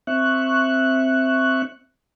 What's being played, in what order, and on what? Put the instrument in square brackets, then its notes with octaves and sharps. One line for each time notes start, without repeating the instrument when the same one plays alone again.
[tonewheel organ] C4 E5 C#6 F#6